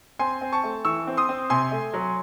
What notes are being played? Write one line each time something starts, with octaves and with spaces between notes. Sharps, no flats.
C4 G#5 C6
C4
A5 C#6
A3
E3 C#6 E6
C4
C6 D#6
C4
C3 G#5 C6
A3
F#3